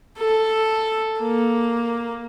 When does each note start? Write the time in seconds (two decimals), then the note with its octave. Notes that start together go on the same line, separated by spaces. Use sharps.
0.18 A4
1.19 A#3